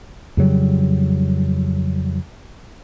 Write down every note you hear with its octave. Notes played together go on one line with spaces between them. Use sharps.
F2 C#3 F#3 G3